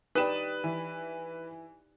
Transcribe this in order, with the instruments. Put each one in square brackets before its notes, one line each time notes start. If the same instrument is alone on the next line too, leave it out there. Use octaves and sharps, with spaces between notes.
[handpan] D#4 G4 D5 [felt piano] B4 E7 [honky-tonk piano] G5 D#6
[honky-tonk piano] E3